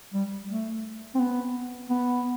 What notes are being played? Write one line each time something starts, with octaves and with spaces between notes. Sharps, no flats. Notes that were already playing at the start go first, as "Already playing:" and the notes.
G3
A3
C4
B3
B3